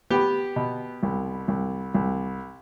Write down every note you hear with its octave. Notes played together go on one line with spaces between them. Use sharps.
B3 G4
B2
C2
C2
C2